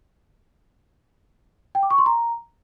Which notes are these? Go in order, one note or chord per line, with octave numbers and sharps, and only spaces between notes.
G5
D6
C#6
C6
A#5